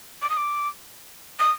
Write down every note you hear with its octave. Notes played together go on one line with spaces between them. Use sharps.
D6
D#6
D6
D#6